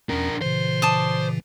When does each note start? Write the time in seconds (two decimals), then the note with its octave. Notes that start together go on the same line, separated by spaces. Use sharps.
0.09 E2 C#4 D4 A#4
0.41 A#2 C#3 E3 C5
0.82 D5 A5 D#6